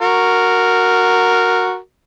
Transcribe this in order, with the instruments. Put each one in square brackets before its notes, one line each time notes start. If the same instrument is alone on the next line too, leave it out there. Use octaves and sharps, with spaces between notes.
[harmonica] F#4 A#4